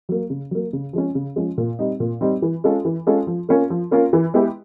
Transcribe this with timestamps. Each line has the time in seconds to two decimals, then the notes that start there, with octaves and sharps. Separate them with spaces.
0.09 F#3 A#3
0.30 C#3
0.51 F#3 A#3
0.73 C#3
0.93 F3 G#3 C#4
1.15 C#3
1.36 F3 G#3 C#4
1.58 A#2
1.79 G3 C4 D#4
2.00 A#2
2.21 G3 C4 D#4
2.42 E3
2.64 G#3 C#4 F4 A4
2.85 E3
3.07 G#3 C#4 F4 A4
3.27 F3
3.49 A#3 C#4 F4 A#4
3.70 F3
3.91 A#3 C#4 F4 A#4
4.13 E3
4.34 G#3 B3 E4 G4